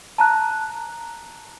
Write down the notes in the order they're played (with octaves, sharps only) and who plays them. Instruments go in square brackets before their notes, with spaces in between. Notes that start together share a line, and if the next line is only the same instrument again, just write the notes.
[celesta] A5 A#5 F#6